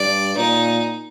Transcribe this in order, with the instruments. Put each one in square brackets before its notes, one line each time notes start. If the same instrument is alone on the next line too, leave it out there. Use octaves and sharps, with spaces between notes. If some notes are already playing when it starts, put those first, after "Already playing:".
Already playing: [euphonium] G2 [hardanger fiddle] D5
[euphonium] A#2 [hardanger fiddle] D#4